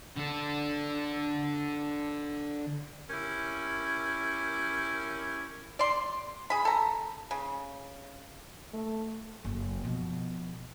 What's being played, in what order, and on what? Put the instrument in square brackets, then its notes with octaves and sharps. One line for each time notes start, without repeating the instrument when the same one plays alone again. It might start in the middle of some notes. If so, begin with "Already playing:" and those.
[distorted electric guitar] D3 A4
[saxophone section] C#4 E4 G4 A#4
[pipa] D5 C6
G#4 B5
A4 A#5
C#3
[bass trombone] A3
[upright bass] F#1 F#2
B2 F3